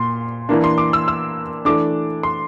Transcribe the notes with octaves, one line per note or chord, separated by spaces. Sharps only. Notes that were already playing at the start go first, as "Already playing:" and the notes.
Already playing: A#2 C6
E3 A#3 D4
C6
D6
E6
E6
E3 A3 D4 D6
C6